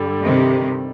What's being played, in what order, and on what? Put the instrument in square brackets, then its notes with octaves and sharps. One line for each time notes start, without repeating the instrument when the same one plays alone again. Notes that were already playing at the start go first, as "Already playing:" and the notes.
Already playing: [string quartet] G2 D3 G3
[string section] C3 D#3